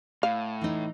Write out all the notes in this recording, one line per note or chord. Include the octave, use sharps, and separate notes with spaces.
A2 F5
E3 D#4